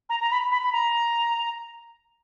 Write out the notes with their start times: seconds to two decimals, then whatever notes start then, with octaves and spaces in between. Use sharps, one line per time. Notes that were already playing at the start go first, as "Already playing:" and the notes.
0.09 A#5
0.21 A#5
0.31 B5
0.52 B5
0.63 B5
0.72 A#5